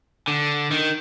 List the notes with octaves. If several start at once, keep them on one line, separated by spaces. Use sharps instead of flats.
D3
D#3